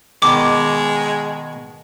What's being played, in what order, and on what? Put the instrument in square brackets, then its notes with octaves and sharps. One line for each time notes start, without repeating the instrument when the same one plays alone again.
[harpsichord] B2 D#3 [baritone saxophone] G#3 [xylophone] D6